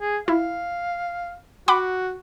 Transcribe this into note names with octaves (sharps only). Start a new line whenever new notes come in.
G#4
E4 F5
F#4 F#5 B5 D6